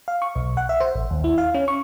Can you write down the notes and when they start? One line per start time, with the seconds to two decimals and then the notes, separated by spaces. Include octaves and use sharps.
0.08 F5
0.22 C#6
0.35 B1
0.57 F#5
0.69 E5
0.80 C5
0.95 A1
1.10 D#2
1.24 E4
1.38 F5
1.54 C#4
1.68 C#6